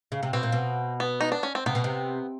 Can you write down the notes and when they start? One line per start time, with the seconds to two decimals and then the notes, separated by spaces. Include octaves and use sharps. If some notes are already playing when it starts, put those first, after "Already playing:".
0.12 C#3
0.23 C3
0.33 B2 C4
0.43 A#2
0.52 B2
1.00 B3
1.21 D#4
1.32 D4
1.43 C#4
1.55 C4
1.66 C3 B3
1.75 B2
1.84 C3